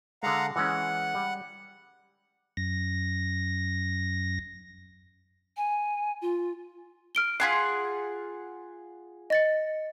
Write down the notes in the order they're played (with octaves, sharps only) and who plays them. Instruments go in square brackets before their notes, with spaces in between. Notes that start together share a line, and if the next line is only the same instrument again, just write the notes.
[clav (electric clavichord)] D3 G#3 [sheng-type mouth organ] F5 F#5 A#5
[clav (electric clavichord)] E3 G#3 C#4 [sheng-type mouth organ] F#5
[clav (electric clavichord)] G3
[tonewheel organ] F#2 A#6
[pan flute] G#5
F4
[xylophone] F6 D7 G7
[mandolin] F4 G#4 F#5 [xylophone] B6 C7
[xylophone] D#5 A6 C#7